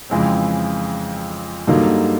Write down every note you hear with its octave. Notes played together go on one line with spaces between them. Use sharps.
F2 C#3 E3 G#3 C4
G2 D3 F#3 A#3 D#4